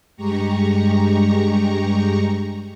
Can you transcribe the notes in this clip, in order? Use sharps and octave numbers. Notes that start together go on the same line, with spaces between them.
G2 G#3 G4 A#5 C#6